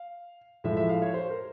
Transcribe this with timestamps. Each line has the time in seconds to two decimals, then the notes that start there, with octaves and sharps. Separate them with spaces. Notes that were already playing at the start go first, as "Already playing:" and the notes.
Already playing: F5
0.64 A2 F3 G#3 E5
0.77 E5
0.89 F5
1.02 C#5
1.14 C5
1.30 A#4